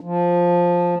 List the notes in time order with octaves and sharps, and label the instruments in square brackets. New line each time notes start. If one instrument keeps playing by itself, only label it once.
[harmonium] F3